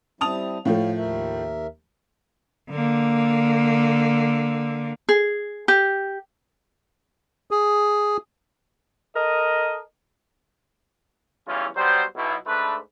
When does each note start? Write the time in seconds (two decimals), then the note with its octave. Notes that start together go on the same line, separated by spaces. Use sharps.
0.21 G3 C4 E4 A5 D#6 F7
0.65 A2 F3 A3 C#5 F5
0.98 D#2 A#4 E5
2.70 D3 A#3
5.09 G#4
5.68 G4
7.51 G#4
9.15 A4 A#4 D#5
11.47 B1 E2 E3 G3 C#4 F4
11.76 F#3 G3 B3 C5
12.15 B1 B2 E4
12.46 G#2 A3 D4 B4